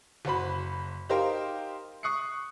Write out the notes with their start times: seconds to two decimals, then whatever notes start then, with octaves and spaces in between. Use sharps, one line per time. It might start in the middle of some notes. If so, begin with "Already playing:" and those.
0.25 F#1 F#4 C5 B5
1.09 D#4 G4 A#4 C5 F5
2.03 C#6 D#6 F#6 C7 C#7